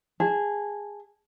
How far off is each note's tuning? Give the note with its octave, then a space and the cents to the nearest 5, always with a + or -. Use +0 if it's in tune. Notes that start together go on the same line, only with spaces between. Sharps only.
G#4 -15 A5 -15